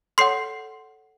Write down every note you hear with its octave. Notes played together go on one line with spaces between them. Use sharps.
A4 C#5 F#5 C6 C7